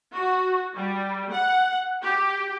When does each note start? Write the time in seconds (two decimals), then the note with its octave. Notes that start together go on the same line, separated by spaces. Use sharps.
0.14 F#4
0.74 G3
1.31 F#5
2.03 G4